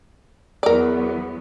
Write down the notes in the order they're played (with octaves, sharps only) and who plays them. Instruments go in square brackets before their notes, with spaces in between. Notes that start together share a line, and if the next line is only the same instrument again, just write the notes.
[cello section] E2 F#3 B3 [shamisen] A#4 D5